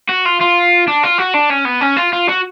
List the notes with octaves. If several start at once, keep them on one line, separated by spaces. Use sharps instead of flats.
F#4
F4
F4
D4
F4
F#4
D4
C#4
B3
C#4
F4
F4
F#4